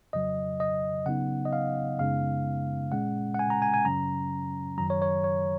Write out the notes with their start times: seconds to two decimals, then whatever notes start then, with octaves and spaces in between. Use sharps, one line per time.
0.13 F2 C#3 F#3 D#5
0.60 D#5
1.06 C#3 F#3 B3 D#4 F#5
1.45 D#5
1.53 F5
1.99 F#2 C#3 G#3 B3 D#4 F5
2.92 A#2 G#3 C#4 F#5
3.34 F#5
3.39 G#5
3.50 A#5
3.62 G#5
3.74 G#5
3.85 F#2 C#3 F#3 C#4 A#5
4.78 F#2 D#3 F#3 A#5
4.90 C#5
5.02 C#5
5.24 C#5